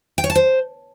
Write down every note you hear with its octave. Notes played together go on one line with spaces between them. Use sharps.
G5
C#5
A5
C5